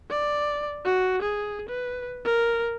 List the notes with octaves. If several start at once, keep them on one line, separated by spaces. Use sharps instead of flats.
D5
F#4
G#4
B4
A#4